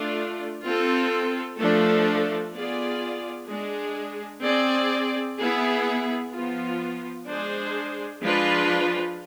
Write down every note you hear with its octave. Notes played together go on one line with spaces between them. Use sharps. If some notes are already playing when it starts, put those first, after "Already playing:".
Already playing: A3 D4 F4
C4 F4 A4
F3 A3 D4 A4
B3 F4 G#4 D5
G#3 D4 G#4
C4 G#4 D5
B3 E4 G#4
F3 B3 F4
G#3 D4 G#4 C5
F3 G#3 D4 F4 B4